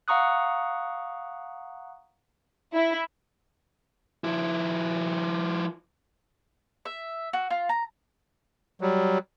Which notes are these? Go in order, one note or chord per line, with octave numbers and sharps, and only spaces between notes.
F5 F#5 A#5 C#6 D#6 F#6
E4
F3 E4
E5
F#4
F4
A#5
F#3 G3